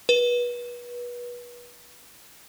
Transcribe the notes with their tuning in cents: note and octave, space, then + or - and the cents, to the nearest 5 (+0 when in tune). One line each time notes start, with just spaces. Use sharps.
B4 -30